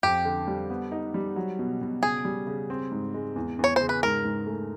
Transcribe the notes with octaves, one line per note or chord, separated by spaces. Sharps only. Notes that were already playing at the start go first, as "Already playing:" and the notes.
F2 G4
D3
G3
B3
D#4
G3
F#3
B2
B2
C#3 G#4
G3
C#3
C4
G#2
G#3
E2
E2 C#5
C#3 C5
B4
G#2 A#4
G#2
A3